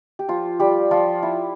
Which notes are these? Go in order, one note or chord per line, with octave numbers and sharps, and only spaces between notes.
G4
F3 F4
G3 G4
F3 F4
E4